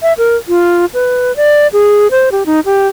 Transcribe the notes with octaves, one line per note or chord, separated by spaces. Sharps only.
E5
A#4
F4
B4
D5
G#4
C5
G4
D#4
G4